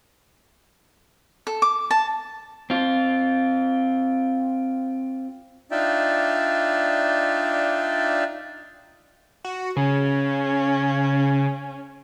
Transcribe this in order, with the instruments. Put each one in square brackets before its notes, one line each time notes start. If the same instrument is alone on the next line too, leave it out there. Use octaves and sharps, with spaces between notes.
[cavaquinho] A4
D6
A5
[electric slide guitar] C4 F4
[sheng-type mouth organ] D4 D#4 F4 D5 E5 G5
[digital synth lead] F#4
[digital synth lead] C#3 [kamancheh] C#4